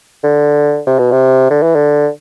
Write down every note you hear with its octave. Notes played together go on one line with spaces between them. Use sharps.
D3
C3
B2
C3
D3
E3
D3